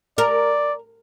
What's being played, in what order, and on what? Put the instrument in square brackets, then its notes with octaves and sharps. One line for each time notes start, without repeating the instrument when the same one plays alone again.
[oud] A#4 [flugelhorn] D5